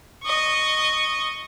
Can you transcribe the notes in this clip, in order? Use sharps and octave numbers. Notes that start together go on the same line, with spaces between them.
D#5 C#6